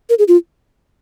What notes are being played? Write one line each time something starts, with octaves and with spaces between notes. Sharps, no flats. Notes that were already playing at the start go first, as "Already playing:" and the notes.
A#4
G#4
F4